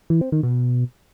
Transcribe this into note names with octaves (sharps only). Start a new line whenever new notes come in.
E3
C4
D#3
B2